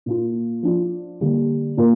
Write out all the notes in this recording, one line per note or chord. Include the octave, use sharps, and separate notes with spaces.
A#2 A#3 F4
F3 D4 F4
D3 G3 A#3
A#2 A#3 F4 A#4